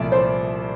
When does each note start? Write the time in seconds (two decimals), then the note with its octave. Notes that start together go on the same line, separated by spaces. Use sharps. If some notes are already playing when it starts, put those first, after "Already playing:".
Already playing: C2 A#2 F3 A3 D5 E5
0.12 C5